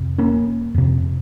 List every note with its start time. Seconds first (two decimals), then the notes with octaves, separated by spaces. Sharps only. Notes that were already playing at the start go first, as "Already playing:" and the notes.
Already playing: F2 C3
0.18 A#3 C#4
0.74 F2 C3